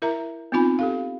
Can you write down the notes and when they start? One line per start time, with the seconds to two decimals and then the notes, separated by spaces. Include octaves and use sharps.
0.02 E4 A#4 E5 A#5
0.52 B3 C4 D#4 F4 G#5 B5
0.79 G4 A4 F5